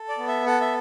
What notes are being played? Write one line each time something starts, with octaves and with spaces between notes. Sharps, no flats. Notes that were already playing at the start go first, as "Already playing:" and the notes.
Already playing: A4
D5
B3
E5
A4 F#5
E5